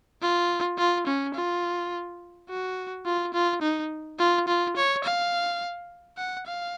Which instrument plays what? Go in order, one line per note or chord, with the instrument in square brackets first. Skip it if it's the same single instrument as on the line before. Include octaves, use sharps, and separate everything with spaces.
[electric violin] F4
F4
C#4
F4
F#4
F4
F4
D#4
F4
F4
C#5
F5
F#5
F5